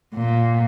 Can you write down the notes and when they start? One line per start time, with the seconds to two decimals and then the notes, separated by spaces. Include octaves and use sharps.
0.15 A#2